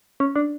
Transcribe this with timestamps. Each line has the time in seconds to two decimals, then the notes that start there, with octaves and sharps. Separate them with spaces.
0.20 C#4
0.36 D4